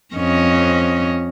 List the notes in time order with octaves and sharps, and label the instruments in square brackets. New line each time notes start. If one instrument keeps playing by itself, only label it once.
[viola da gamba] F2 C#4 D#5